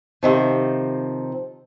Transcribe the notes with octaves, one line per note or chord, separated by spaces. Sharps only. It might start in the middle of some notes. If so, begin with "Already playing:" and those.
C3 D#3 F3